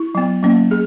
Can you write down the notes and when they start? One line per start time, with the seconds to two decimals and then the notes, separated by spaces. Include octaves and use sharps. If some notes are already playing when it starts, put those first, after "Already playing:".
Already playing: E4
0.15 F#3 B3
0.43 F#3 A#3 C#4
0.71 G#4